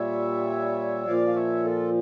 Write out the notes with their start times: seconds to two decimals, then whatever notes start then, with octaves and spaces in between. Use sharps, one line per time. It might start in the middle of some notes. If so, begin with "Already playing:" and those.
Already playing: A#2 G3 C#5 E5
1.07 A#2 F3 D5 F5
1.28 F5
1.35 C#5 E5
1.64 F4 A4